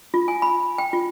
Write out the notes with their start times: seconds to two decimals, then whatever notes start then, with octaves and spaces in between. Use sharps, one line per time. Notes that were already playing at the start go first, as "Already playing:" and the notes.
0.14 F4
0.28 G#5
0.42 B5
0.78 G5
0.93 F4